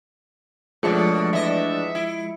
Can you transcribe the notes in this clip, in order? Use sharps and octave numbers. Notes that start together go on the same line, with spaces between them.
F#2 B2 F3 G#3 A3 D4 C#7
E2 D#5 E5
E4